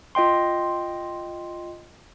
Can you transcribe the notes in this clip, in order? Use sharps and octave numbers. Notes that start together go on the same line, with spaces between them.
F4 D#5 G5 C6